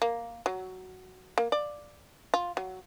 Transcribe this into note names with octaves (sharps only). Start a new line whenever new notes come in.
A#3
F#3
A#3
D5
F4
F#3